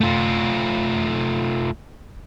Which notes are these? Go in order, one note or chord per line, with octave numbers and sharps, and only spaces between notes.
A3 F4